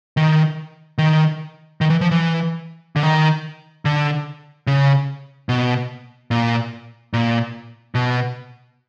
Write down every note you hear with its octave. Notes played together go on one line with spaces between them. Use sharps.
D#3
D#3
D#3
E3
F3
E3
D3
D#3
D3
C#3
B2
A#2
A#2
B2